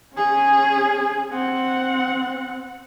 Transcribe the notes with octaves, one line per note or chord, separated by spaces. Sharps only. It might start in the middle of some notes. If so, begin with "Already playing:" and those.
C#4 G#4
C4 F#5